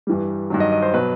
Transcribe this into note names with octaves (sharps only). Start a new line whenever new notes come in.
G2 E3 G3
G2 D#3 F#3
D#5
D#5
C5
B2 F#3 B4